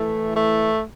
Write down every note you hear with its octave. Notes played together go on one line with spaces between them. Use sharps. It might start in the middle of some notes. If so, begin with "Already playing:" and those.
Already playing: A2 E3 A3
A3